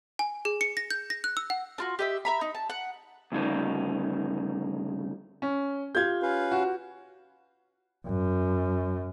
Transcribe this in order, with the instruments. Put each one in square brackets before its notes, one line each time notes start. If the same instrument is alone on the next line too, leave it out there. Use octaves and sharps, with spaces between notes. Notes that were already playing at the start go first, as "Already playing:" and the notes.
[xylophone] G#5
G#4
C#7
A#6
G6
A#6
F#6
E6
F#5
[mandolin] D4 F4 F#4
G4 D#5 E5
E5 A#5 B5
D#4
A5
F#5
[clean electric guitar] D2 G2 C#3 D#4
[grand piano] C#4
[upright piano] F4 G4 [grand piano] G6 G#6
[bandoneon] C#4 B4 F5
[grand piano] F#4
[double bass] F#2